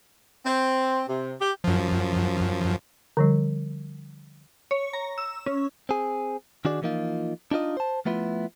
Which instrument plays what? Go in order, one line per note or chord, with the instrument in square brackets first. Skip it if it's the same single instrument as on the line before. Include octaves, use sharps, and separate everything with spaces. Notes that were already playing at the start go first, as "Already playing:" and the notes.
[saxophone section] C4
C3
G4
[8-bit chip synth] F#2 F3
[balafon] D3 F3 G3
[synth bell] C#5
A#5
E6
C#4
[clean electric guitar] C4 G#4
D#3 D4 F#4 G#4 D5
E3 F3 A#3 D#4 F4
D4 D#4 F4 D#5
C5 A5
F3 A3 B3 E4 F4